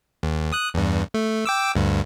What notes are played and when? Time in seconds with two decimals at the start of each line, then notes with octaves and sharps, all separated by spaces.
0.23 D#2
0.52 D#6 F#6
0.74 E2 G2
1.14 A3
1.45 G5 D6 E6
1.75 D2 G2